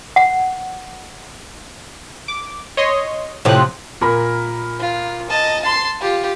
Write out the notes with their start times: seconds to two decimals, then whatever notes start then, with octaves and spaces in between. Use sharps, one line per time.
0.16 F#5
2.28 D6
2.77 C#5 D#5 C6
3.45 A2 C3 F3 F#6
4.01 A#2 A#4 B5
4.79 F4
5.30 D#5 A5
5.62 A5 C6
6.00 F4 G4